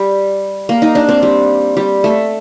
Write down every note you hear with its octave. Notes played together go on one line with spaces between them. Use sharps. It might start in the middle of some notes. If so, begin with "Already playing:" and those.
Already playing: G3
A#3
D#4
D4
C4
G3
G3
A3